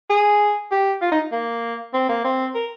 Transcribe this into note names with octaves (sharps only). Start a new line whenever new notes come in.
G#4
G4
F4
D#4
A#3
C4
A#3
C4
A#4